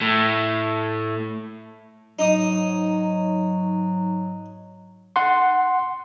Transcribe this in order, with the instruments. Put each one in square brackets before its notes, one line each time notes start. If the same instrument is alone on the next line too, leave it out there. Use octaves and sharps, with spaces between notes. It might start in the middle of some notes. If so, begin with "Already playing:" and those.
[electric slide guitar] A2
[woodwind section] G#2 F#3 [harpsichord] D#4 D#6
[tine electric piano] F#5 C6